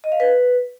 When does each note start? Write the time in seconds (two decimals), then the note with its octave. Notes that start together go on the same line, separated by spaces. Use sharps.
0.04 D#5
0.12 F5
0.20 B4